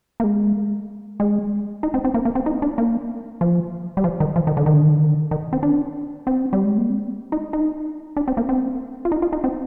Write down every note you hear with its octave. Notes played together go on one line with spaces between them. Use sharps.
A#3
G#3
G#3
D#4
C4
C4
A#3
A#3
C4
D#4
D4
A#3
F3
G3
F3
D#3
F3
D#3
D3
D#3
D3
D#3
D3
D#3
D3
D#3
C4
D4
C4
G3
G#3
A#3
C4
D#4
D#4
D4
C4
A#3
C4
F4
D#4
F4
D#4
C4